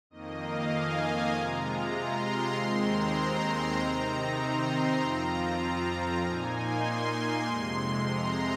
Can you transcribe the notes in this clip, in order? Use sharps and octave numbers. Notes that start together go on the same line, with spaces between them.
F2 D#3 A#3 D#5
F5
G#5
C3 G#3 F4 A#5
A#5
C6
A#5
D#2 D#3 G#3 C4 C6
A#5
C3 D#3 C4 D#4
C6
A#5
F2 F3 C4 F4
A#2 A#3 D#4 G#5
C6
F2 C3 G#3
A#5